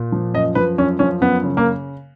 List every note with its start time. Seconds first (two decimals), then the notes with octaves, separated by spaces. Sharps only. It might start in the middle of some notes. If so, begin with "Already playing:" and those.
Already playing: A#2
0.12 F3
0.34 F#2 D#5
0.55 F3 B4
0.78 F#2 C#4
0.99 F3 C#4
1.21 F#2 B3
1.43 C#3
1.57 A#3